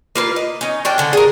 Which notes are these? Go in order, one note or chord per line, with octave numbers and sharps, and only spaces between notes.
A#3 F4 B4
D#5
C#4 D#4
C#4 D4 G5
D3 C#4
G#4 A#4